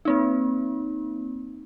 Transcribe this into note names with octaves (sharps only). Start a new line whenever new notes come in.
A#3 C4 D#4